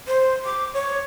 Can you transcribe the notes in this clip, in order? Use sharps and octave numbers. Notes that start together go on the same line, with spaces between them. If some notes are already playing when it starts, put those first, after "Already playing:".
C5
D6
C#5